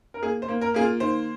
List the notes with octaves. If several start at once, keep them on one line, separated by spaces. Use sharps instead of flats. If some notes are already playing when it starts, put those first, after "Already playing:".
A#4
A#3 G#4
C5
A#3
A#4
A#3 G#4
F4
D#3 C5